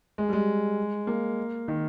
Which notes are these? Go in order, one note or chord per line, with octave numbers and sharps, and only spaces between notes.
G#3
G3
G#3
A#3
D#3